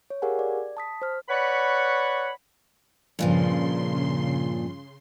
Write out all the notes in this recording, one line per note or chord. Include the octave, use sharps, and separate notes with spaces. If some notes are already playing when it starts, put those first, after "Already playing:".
C#5
G4 G#4 A#4 F5 F#5 G#5
D5
A5 D#6 B6
C5 F6
B4 C#5 D5 F#5 B5 C#6
G2 A#2 C#3 F3 C6